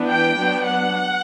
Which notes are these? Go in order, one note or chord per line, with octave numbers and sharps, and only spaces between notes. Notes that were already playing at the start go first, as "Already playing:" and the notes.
Already playing: E3 B3 D4
G5
F#3 B3 D4
F#5